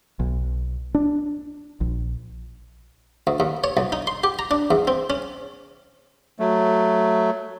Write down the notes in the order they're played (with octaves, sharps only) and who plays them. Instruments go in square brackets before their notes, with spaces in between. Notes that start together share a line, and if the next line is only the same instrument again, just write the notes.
[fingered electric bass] B1
D4
A#1
[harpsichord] D2
D#2
C#5
B1
D#4
C6
G4
A#5
D4
E2
C4
C#4
[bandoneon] F#3 A3